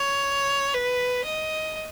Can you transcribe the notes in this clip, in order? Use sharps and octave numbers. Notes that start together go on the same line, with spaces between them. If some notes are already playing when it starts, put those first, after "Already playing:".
Already playing: C#5
B4
D#5